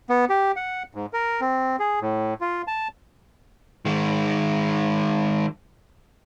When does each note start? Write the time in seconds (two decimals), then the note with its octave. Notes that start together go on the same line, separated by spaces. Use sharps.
0.10 B3
0.30 G4
0.56 F#5
0.95 G#2
1.13 A#4
1.41 C4
1.79 G#4
2.01 A2
2.41 F4
2.68 A5
3.85 D#3 G#3